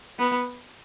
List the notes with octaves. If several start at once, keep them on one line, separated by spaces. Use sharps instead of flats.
B3